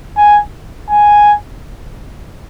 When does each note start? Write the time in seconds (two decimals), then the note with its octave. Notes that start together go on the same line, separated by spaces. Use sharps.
0.17 G#5
0.90 G#5